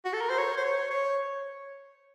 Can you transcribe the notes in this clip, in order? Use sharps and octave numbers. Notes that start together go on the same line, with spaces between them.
F#4
A4
A#4
C5
C#5
C5
C#5
C#5